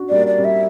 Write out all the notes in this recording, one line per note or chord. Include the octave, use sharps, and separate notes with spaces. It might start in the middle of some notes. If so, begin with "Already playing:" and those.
Already playing: D4 F#4
G3 D5
A#3
D5
G3
E5